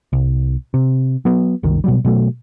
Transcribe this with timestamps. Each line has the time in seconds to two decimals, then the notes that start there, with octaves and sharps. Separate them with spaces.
0.13 C2
0.74 C3
1.25 F#3 B3
1.63 F#1 C2 D#3
1.84 B2 F#3 G3
2.05 B2 F#3 A3